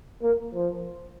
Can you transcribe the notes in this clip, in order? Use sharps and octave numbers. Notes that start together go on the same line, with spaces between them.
A#3
F3